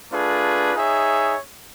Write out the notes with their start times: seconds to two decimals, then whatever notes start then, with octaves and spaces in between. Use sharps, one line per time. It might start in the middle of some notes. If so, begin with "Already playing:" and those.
0.10 A3 D4 F4 G#4 B4
0.74 D#4 G#4 C#5 E5